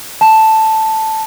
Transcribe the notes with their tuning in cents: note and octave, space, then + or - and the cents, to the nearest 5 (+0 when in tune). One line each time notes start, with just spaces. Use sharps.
A5 +0